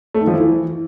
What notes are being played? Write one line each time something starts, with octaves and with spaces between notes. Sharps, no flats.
A3
D#3
F3
E3